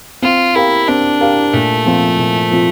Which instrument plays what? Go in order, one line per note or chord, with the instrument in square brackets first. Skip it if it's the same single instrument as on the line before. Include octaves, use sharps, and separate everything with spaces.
[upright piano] C4 [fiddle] F4
[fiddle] E4 [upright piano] G4 A#4 F5
[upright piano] C4 [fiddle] D4
[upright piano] G4 A#4 F5
[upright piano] A#2 [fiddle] A3
[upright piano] F3 C4 F4
A#2
F3 C4 F4